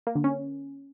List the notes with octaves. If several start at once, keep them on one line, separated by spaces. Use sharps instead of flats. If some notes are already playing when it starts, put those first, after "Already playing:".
A#3
D3
C#4